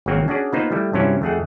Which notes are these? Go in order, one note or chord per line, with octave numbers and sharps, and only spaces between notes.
G#1 C#3 F#3 A#3 C4
C#4 D4 F#4 G#4 D5
A#3 B3 D#4 F4 B4 C5
G3 A3 E4
G2 C3 F#3 C#4 E4 D5
F2 A3 G#4 F#5